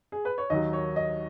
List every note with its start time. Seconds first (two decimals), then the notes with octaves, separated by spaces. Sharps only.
0.12 G#4
0.25 B4
0.38 C#5
0.50 D#2 D#3 F#3 D#5
0.73 C#5
0.96 D#5